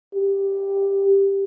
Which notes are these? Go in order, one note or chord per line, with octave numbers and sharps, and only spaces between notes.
G4